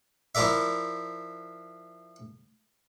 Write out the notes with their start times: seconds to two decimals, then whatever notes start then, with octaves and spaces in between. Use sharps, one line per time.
0.35 F3 E4 A#4 D5 E5